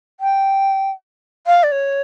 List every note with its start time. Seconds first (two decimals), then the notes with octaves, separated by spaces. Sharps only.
0.20 G5
1.47 F5
1.63 D5
1.72 C#5